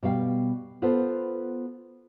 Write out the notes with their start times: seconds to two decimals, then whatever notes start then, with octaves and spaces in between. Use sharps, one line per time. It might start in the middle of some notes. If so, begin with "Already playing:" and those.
0.03 B2 G3 F5 G5
0.82 B3 F4 A4 B4 C5